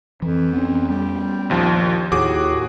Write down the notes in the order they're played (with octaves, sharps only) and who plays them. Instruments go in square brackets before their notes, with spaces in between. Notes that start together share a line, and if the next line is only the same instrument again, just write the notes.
[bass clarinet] F2 [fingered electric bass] E3
[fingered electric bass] B3 C#4
[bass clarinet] G3
[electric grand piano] A#1 D#2 F3
[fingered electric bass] D#2 [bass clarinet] A2 [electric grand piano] F#4 G#4 D6